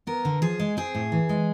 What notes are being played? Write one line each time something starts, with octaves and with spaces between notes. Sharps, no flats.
B3 A#4
D3
F3 G#4
G#3
C4 G#4
A2
E3
G#3